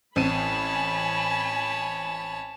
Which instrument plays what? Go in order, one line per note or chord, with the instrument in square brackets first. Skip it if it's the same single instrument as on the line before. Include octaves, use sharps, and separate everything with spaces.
[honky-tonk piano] A1 C4 D#7 [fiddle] C#5 A5 [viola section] G#5 B5